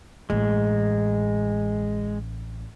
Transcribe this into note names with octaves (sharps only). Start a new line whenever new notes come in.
A1 G#3